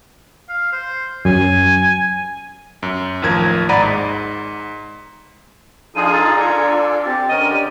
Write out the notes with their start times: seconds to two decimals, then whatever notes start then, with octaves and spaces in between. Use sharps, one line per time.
0.49 F5
0.72 C5
1.25 F#2 G#5
2.83 F#2
3.22 A1 D#2 F3 A#4 G#6
3.69 G#1 D5 F#5 A#5 B5 D#7
3.82 G#2
5.96 F3 D4 D#4 F4 G#4 A4 D#7
6.13 A4 A#5 A6
6.37 D4 F4 A4 D5 G#5
7.06 C4 G4 A6
7.29 D3 C#4 A#4 D#5 D#7
7.51 G4 D5